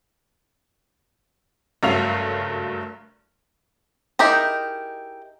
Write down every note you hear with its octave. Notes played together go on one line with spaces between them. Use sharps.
F#1 G2 F#3 A3 F5 F7
D#4 E4 G4 G#4 A#4